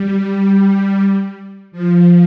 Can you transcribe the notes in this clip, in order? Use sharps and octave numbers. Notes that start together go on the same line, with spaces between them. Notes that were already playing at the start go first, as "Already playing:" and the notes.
Already playing: G3
F3